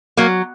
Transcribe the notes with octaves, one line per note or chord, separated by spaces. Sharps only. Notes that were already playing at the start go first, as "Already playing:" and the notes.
F#3 A#3